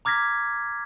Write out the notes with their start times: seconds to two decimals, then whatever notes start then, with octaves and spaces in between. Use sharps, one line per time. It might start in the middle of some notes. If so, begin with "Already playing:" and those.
0.05 A#5 D6 F6 G#6 A#6 B6